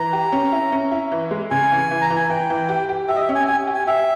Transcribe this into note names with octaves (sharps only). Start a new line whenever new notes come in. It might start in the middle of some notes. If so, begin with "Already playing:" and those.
Already playing: E3 A#5
G4
C#4
E4
C#4
E4
E3
G#3
C#3 G#5
E3
E3
A#5
E3
G#5
E3 G5
E3
G4
G4
G4 E5
D#5
E5
C#4
G#5
G4 G#5
G4
G#5
G4 E5